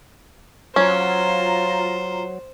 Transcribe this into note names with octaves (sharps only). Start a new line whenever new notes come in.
F#3 C#4 F4 C5 A#5